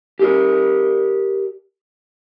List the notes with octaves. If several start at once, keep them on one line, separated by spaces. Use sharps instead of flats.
G4 A#4 D5